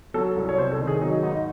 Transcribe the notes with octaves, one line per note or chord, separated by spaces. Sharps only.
F#3 A4
C2
C#5
C3 C5
A4
D#3
G#4
F#3 D#4
G#1 D#4